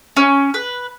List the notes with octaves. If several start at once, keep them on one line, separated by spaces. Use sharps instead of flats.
C#4
B4